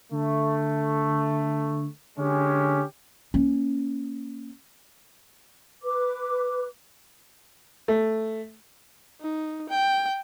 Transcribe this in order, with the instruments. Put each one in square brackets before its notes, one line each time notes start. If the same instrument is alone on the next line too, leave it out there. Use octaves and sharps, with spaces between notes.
[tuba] D3 [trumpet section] A3
[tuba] D3 [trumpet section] G#3 C#4 G4
[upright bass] A#3 C#4
[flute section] B4 D6
[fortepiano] A3
[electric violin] D#4
G5